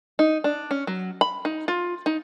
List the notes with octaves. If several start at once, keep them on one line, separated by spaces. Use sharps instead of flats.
D#4
D4
C#4
F#3
B5
D#4
F4
D#4